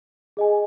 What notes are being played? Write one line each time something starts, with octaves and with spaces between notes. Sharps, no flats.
G#4 D#5 G#5